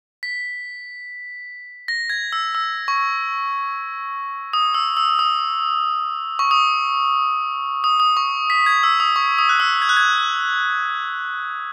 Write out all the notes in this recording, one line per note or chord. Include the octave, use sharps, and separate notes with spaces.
B6
A#6
G#6
E6
E6
C#6
D#6
E6
E6
D#6
C#6
D#6
D#6
D#6
C#6
B6
G#6
E6
D#6
C#6
D#6
F#6
E6
G#6
F#6
G#6